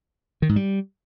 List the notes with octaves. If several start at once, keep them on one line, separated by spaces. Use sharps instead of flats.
D#3
G#2
G3